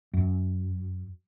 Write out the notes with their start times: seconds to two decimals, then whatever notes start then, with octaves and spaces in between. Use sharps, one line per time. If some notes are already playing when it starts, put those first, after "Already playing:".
0.13 F#2